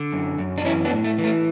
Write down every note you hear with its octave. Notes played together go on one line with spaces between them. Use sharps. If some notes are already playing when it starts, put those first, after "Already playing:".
Already playing: D3
F#2
F#2
D4
E3 C#4 E4
B3 D4
A2
A3
E3
A3